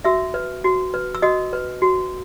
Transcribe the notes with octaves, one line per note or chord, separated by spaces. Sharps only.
F#4 E5 E6
B4
F#4
B4
E6
F#4 D#5 D#6
B4
F#4